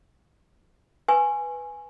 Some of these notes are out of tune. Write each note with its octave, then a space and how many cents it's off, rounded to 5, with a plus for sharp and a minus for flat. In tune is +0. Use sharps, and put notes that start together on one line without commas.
B4 +0 G#5 +0 C#6 -35